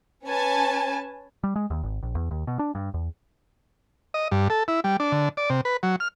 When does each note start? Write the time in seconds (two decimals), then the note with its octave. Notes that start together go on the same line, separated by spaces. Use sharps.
0.24 C#4 B4 G#5 A5
1.44 G3
1.56 G#3
1.70 D#2
1.83 G#1
2.03 A#1
2.15 E2
2.31 D#2
2.47 B2
2.59 D4
2.75 G2
2.94 E2
4.14 D#5
4.31 G2
4.50 A4
4.68 E4
4.84 G3
5.00 D4
5.12 D3
5.37 D5
5.50 C3
5.65 B4
5.83 F#3
6.00 F6